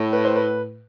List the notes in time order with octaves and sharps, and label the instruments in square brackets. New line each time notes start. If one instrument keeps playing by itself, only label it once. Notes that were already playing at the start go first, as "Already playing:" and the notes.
Already playing: [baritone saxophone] A2
[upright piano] B4
C5
B4